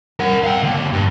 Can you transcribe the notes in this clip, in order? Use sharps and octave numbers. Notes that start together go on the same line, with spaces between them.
A#4 F#5
F5 G5
D3 A#3
G2